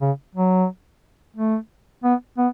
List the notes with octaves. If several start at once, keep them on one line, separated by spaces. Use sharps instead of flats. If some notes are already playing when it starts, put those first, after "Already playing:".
C#3
F#3
A3
B3
B3